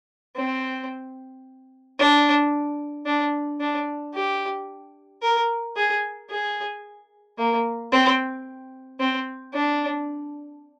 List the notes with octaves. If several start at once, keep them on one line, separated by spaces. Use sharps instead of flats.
C4
D4
D4
D4
G4
A#4
G#4
G#4
A#3
C4
C4
D4